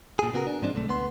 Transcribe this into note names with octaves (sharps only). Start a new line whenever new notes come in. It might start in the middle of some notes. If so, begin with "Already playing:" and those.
A#2 G#4
C#3 B3 F#4 G#4 A#4
D4
G#2 F3 G#3 C4 D4
B1 D3 A3
D2 B3 C6